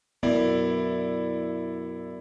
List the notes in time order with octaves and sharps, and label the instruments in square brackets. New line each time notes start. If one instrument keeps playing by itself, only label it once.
[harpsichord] F#2 [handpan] B3 [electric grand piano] E4 D5